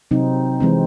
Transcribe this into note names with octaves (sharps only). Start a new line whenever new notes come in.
C3 F#3 C4 D#4
E3 G#3 C4